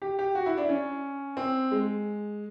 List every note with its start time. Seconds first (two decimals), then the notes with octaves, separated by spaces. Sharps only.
0.02 G4
0.19 G4
0.35 F#4
0.46 E4
0.58 D4
0.69 C#4
1.37 C4
1.71 G#3